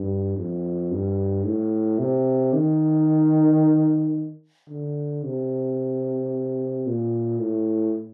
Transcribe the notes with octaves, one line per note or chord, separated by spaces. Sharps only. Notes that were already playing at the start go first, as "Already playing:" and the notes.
Already playing: G2
F2
G2
A2
C3
D#3
D3
C3
A#2
A2